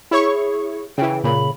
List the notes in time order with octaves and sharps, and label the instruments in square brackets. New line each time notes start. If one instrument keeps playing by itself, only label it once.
[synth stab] E4 C#5 C#6 [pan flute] G#4
[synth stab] C#3 E3 [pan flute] G5
[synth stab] A#2 [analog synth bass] C#3 [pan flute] B5